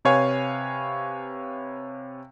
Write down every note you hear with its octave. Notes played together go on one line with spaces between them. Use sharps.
C3 B4 C#5 F5 G#5